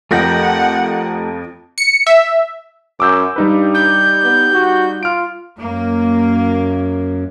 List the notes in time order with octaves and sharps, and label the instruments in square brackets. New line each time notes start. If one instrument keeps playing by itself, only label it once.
[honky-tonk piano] F2 F3 A#6 [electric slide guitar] A3 G4 A#4 [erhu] F#5
[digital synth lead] C#7
E5
[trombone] F#2 [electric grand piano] D6 E6 G6
[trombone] G2 [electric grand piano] G3 D#4 B4
[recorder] G6
[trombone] B3
F#4
[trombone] F4 [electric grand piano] F6 D7
[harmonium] F#2 [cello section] A#3